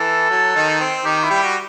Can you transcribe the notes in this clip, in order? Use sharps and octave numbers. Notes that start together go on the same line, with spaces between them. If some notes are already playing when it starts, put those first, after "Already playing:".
Already playing: E3 A4
F#3
D#3 D#4
C4
D#3 D#4 G4
E4
G3 G4
F#4